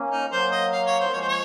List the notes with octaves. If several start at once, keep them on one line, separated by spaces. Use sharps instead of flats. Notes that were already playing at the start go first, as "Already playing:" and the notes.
Already playing: A#3 C#4
D#4
F#3 A#3 C5
D#5
F5
C#5
C5
F3 G#3 C#5
C5
C#5